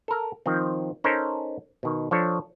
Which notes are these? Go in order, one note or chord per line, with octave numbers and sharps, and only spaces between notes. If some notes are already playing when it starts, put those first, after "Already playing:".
A4 A#4
D#3 F3 C4
C#4 D#4 A4 A#4 C5
B2 D#3
F3 D4 A4 C#5